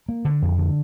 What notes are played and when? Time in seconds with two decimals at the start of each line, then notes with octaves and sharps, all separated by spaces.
0.09 A#3
0.25 D3
0.42 F2
0.58 D3